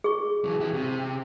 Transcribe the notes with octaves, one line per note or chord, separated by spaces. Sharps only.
G#4 C#6
E3 F#3
E4 G4
C3